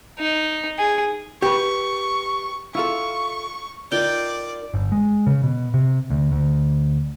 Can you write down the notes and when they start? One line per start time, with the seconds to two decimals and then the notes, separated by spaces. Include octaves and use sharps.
0.19 D#4
0.79 G#4
1.42 G4 B4 C#6
2.75 E4 F4 A4 C#6
3.92 D#4 F4 A#4 D5 G5
4.74 G1
4.92 G#3
5.27 C#3
5.43 B2
5.74 C3
6.10 D2
6.32 D2